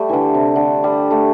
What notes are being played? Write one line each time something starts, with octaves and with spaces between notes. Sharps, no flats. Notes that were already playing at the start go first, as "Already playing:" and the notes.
Already playing: G3 A3
D3 E3
C3
D3
G3
A3